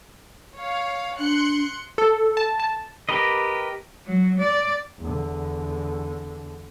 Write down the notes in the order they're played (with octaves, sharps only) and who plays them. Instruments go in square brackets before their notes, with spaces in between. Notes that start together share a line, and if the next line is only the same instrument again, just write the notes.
[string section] C#5 F5
[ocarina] D4 [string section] C6 F#6 C#7
[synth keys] A4
A5
A5
[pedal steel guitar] G4 A#4 B4 D#5
[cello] F#3
D5
[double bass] E2 D3